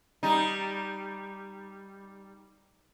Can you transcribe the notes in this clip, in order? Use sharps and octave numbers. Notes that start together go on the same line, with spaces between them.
G3 D#4